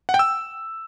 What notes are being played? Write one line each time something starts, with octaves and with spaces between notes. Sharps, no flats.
F#5
G5
E6